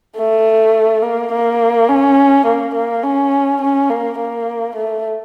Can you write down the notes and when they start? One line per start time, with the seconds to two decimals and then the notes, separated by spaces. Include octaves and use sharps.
0.17 A3
1.02 A#3
1.32 A#3
1.89 C#4
2.46 A#3
2.75 A#3
3.03 C#4
3.61 C#4
3.90 A#3
4.18 A#3
4.75 A3